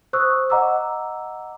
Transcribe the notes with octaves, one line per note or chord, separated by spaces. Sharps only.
C5 C#6 D#6 E6 F#6
D#5 F#5 A#5 D6 E6